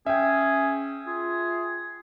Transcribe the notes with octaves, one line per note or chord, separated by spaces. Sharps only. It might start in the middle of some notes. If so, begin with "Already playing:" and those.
C#4 G#4 E5 G5
F4 G#4